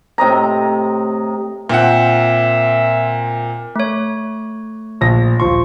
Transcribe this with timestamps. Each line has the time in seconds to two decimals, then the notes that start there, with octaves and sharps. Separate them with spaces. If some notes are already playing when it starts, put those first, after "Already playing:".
0.18 A2 C3 D#5 A#5
1.69 A#2 C4 E5 F#5
3.76 A3 C#5
5.01 A#1 A#6
5.40 D#1 F3 C6 C#6